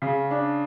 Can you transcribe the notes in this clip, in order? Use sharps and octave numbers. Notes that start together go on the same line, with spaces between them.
C#3
D4